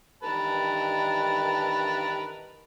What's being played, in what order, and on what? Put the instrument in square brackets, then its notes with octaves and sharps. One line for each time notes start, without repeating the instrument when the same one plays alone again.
[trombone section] G2 D#3 E3 [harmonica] A#4 B4 A5